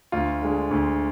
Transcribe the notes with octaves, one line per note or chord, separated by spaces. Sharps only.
D2 F4
D3 G#3
D2